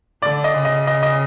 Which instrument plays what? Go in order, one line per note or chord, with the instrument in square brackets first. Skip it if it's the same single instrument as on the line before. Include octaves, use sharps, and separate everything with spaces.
[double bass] D3 [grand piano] D5
[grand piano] D#5
[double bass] C#3
[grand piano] D#5
D#5
D#5